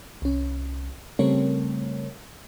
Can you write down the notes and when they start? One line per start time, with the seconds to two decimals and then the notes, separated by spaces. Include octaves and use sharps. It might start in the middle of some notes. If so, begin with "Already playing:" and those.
0.22 C2 C#4
1.19 C#3 G3 A3 C4 A#4 C#5